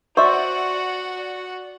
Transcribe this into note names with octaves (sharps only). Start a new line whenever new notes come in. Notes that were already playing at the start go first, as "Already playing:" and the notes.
F#4 C5 D5 E5 F#5 C#6